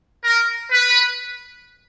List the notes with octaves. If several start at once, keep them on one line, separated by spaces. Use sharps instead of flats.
A#4
B4